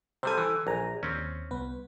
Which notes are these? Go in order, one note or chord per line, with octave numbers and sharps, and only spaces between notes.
C3 G3 A4 C5 G#5
E3
A#1 A#4 G#5 A#5
D#2 C4 C#4
C2 B3 B4